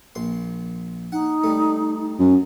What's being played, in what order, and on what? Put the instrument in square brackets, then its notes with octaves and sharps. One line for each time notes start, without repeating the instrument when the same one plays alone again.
[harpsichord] A#1 C6
[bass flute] D#4 [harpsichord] F#5
[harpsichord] G3 A3
[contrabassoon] F#2